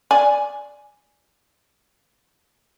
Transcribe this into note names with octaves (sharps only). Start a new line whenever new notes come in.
D5 G#5